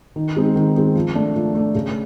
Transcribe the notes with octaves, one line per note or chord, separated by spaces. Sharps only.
D#3
G#3 C4 D#4
D#3
G#3 C4 D#4
F3
A3 D4
F3
A3 D4
C#3